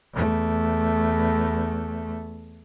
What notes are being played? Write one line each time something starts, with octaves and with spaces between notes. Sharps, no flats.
E2 A3